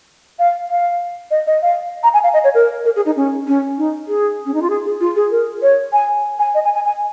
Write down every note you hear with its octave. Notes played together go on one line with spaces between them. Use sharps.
F5
F5
D#5
D#5
F5
A#5
G#5
F5
D#5
C#5
A#4
A#4
G#4
D#4
C#4
C#4
D#4
G#4
C#4
D#4
F4
G#4
G#4
F4
G#4
A#4
C#5
G#5
G#5
D#5
G#5
G#5
G#5